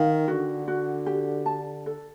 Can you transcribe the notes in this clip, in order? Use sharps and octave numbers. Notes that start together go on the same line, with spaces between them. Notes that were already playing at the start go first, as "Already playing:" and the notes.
Already playing: D#3 F5
D3 F#4
F#4
G4
A5
A4